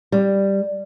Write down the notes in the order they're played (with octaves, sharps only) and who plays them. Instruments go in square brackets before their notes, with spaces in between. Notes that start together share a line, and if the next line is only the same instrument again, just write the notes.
[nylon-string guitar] G3